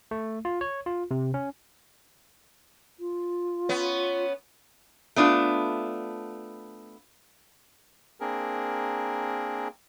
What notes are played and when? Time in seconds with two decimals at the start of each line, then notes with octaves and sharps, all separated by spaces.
0.11 A3
0.45 F4
0.61 C#5
0.86 F4
1.11 C3
1.34 C#4
3.00 F4
3.69 B3 C#4
5.16 A3 B3 D4 F4
8.20 A#3 C4 D4 G#4 A#4